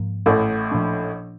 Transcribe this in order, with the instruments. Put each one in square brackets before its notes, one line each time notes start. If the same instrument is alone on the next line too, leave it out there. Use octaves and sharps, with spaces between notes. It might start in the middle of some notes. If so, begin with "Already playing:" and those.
Already playing: [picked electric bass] G#2 F3 A#3
[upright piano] A1 A2
[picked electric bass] A#2 F3 A#3 D4